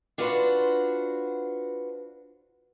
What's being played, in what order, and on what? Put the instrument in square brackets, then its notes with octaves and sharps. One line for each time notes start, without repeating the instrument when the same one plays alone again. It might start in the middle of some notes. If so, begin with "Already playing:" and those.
[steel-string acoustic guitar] D4 F4 F#4 B4 C5